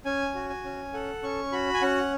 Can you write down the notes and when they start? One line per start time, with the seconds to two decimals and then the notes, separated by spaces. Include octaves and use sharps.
0.05 C#4 G#5
0.35 F#4
0.50 G#5
0.64 C#4
0.94 A4 F#5
1.23 C#4 C#6
1.52 F#4 B5
1.74 G#5
1.82 C#4 F#5